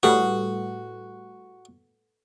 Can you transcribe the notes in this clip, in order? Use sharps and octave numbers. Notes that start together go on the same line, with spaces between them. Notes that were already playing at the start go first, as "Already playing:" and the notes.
A2 G3 F#4 A4 B4 F#5